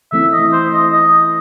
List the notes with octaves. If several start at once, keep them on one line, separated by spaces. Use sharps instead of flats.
E3 A3 C4 E4 E5
D#5
C5
D#5
D#5